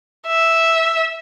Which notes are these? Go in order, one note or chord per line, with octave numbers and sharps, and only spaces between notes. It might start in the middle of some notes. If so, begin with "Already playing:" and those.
E5